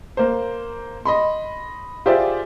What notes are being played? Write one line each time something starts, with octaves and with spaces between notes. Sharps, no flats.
A#3 C5
D#5 B5 C6
F4 G4 G#4 C5 D5 E5